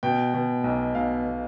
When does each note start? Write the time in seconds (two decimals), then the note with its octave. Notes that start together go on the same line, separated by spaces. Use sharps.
0.03 B2 G5
0.34 B2
0.64 B1
0.95 B1 F5
1.26 B2